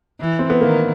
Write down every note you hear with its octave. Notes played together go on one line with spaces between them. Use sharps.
E3
C4
B3
D#3 A#3